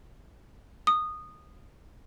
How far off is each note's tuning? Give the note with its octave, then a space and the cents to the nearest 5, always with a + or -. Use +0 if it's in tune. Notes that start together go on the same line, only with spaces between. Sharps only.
D#6 -15